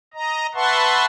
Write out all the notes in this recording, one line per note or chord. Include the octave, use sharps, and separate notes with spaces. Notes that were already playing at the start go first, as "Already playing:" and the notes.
D#5 A#5
B4 E5 F#5 A5 C6 C#6